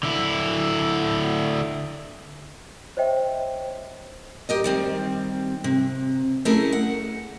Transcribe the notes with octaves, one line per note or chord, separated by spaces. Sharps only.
D3 E4
C5 C#5 D#5 E5 G5
G4 A#4 D#5
D#3 G3 C4
C3
A3 C#4 E4 G#4 A#4
F#5